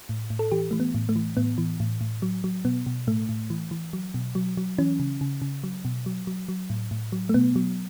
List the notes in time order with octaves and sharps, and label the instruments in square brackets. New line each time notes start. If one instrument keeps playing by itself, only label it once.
[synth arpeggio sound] A2
A2
A4
E3 G4
E3 A3
B3
A2
A3
E3
A2 B3
E3
A2
A2
F#3
F#3
B2 B3
B2
A2 A3
A2
E3
E3
F#3
B2
F#3
F#3
E3 C#4
C#3
C#3
C#3
F#3
B2
F#3
F#3
F#3
A2
A2
F#3
A3
B2 B3
F#3